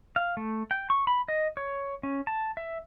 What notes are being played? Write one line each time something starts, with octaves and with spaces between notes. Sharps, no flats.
F5
A3
G5
C#6
B5
D#5
C#5
C#4
A5
E5